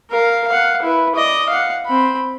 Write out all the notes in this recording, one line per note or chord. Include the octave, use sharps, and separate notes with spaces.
A#4 F5
F5 F#5
E4 B4
D5 D#5
F5 F#5
C4 B5